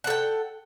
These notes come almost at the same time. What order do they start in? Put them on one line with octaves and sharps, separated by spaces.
F#5 A4 G5